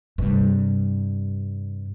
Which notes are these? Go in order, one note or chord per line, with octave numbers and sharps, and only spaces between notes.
G2 C3